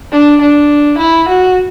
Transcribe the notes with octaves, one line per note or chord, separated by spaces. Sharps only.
D4
D4
E4
F#4